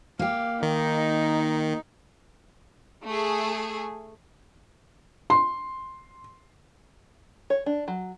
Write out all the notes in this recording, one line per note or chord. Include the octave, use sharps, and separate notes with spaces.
A#3 G4 F5
D#3 D#4
A3 G#4
C6
C#5
D4
F#3